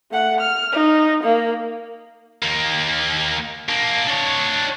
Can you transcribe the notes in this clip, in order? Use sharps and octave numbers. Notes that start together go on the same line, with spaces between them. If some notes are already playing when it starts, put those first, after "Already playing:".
A3 F#5
F6
D#4
A#3
D#2 A#3
A#3 D4
D4 C#5